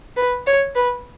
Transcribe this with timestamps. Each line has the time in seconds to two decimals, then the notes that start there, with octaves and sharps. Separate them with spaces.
0.16 B4
0.47 C#5
0.75 B4